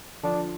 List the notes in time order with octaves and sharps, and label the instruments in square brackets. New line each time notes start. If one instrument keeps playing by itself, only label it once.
[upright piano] D3 F3 [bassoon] D4